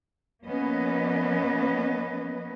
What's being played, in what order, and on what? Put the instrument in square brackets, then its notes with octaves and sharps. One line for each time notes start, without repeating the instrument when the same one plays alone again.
[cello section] F3 A#3 B3 C#4 B4 D#5